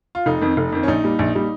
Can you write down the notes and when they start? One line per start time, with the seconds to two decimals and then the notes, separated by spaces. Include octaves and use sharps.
0.15 F4
0.26 F1 D#4
0.42 F2 D#3
0.57 F1
0.72 F2 D#3
0.83 C#4
0.88 A#1 D#4
1.04 A#2 G3
1.19 A#1
1.35 A#2 G3